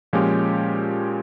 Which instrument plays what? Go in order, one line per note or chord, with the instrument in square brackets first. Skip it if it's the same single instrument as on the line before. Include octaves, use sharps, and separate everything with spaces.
[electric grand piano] A#2 F3 G#3 C#4 G4